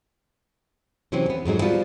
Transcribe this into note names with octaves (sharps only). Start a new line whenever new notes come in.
C3 E3 F#3 C4 C#4
E2 B3
F2 G#2 F#3 G#3
F3 G3 B3 F4 F#4